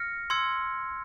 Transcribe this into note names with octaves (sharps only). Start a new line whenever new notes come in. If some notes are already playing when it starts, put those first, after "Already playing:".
Already playing: F6 A#6 C#7
C6 E6 G#6 C#7